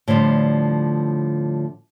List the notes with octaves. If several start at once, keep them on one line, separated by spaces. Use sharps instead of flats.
A2 D3 F3 G3